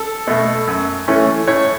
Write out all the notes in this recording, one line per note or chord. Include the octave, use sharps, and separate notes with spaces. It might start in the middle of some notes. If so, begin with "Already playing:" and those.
Already playing: A4
B2 A3
F#2
E3 A3 C#4
A2 C#5